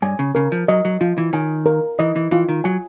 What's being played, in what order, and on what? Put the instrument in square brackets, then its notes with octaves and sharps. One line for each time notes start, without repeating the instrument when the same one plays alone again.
[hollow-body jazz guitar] G2 [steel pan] G#5
[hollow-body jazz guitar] C#3
[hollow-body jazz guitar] C#3 [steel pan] A#4
[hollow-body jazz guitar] F3
[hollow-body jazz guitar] F#3 [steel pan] D#5
[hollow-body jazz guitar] F#3
[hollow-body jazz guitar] F3 [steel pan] F4
[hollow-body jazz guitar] E3
[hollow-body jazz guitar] D#3 [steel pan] G#5
[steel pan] A#4
[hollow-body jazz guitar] E3 [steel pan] D#5
[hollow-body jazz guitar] E3
[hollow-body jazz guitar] E3 [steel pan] F4
[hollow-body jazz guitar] D#3
[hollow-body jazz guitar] F#3 [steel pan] G#5